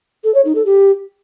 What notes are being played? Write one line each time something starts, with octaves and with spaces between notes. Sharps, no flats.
A4
C#5
D#4
A4
G4